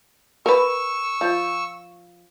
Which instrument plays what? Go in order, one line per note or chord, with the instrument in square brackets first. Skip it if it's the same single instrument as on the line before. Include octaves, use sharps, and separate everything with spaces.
[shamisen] A#4 B4 [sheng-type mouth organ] C#6 E6
[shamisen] F3